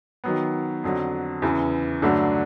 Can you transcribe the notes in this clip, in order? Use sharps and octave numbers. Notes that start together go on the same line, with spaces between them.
D#3 F#3 B3
F2 D3 F#3
E2 C#3 E3
G2 D3 F#3 A3 D4